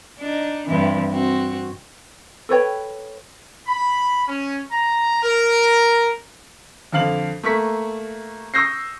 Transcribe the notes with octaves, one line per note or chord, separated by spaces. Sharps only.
D4 D#4
G2 C3 E3
C4 F#4
A4 B4 C#5 G5
B5
C#4
A#5
A#4
F2 D3 F5 F#7
A3 A#3 C#6 B6
C#6 D#6 E6 G6 A#6 C7